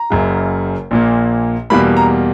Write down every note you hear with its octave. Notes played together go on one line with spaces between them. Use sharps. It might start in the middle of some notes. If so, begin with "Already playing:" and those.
Already playing: A#5
F#1 F#2 C#3
A#1 A#2 A#3
E2 B2 G3 A#3 B5
A#5